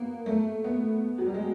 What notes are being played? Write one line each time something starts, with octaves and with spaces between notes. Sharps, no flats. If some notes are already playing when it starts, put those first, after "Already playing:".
Already playing: A#3 B3
A3
B3
F#3
G3
G#3